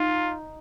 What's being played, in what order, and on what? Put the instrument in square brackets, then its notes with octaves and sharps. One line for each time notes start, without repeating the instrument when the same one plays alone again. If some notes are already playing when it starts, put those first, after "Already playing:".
Already playing: [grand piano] D#4 [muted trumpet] F4